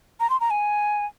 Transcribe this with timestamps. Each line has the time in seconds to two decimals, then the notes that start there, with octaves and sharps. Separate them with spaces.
0.20 A#5
0.30 C6
0.40 A#5
0.50 G#5